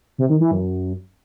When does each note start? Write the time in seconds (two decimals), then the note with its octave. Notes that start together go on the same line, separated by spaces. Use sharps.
0.18 C3
0.29 D#3
0.40 E3
0.51 F#2